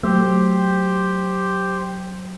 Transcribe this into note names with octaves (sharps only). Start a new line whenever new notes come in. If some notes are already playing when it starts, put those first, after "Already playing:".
F#3 A3 G4 C5